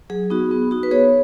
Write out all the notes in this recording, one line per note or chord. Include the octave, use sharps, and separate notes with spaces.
F#3 G#4
B3 D#4 F#4
B3
D#4 F#4
B4
B3 G#4 C#5